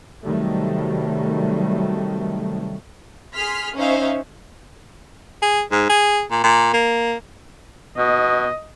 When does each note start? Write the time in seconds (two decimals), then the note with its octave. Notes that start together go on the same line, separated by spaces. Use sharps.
0.23 C3 D#3 F#3 G3 A3
3.33 G#4 C6 F6 B6
3.76 C#4 D#4 C5 E5 F5
5.42 G#4
5.72 G#2
5.90 G#4
6.31 A#2
6.44 A#2
6.74 A#3
7.98 B2 D#5